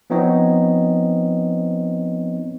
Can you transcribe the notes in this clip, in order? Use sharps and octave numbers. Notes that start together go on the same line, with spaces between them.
F3 B3 C4 D#4 C#5 D#5